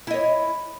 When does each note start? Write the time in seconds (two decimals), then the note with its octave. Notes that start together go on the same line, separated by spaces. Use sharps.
0.07 E4
0.11 D#5
0.14 C#5